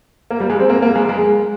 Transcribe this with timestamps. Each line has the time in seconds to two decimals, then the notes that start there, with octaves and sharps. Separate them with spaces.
0.31 A#3
0.40 G3
0.50 G#3
0.60 C4
0.69 A#3
0.82 A#3
0.95 G#3
1.09 G#3